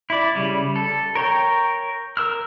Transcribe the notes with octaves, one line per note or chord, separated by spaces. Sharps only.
E4 D5
C#3 G3
A4
A#4 C#5 G5
A#4 E6 F6